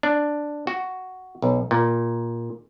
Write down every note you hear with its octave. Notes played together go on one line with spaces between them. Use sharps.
D4
F#4
B1
A#2